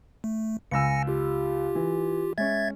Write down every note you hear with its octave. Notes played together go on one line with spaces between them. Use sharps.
A3
C#2 G#5 E6 A#6 C#7
F4 G4
E3
G#3 C#4 E5 G#6 A6